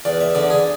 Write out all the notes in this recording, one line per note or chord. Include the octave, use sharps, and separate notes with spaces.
E2 D5
E5
D3 D5
G#4